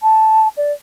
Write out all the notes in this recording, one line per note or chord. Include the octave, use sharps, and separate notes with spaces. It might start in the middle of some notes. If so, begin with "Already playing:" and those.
A5
D5